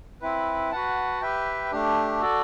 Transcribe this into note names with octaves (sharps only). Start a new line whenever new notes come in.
C4 E4 B4
F#4 B4 F#5 A5
G4 B4 E5 G5
A3 D4 G4
F#4 A4 D5